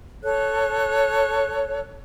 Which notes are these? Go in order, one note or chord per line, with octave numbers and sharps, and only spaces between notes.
A4 C#5 F#6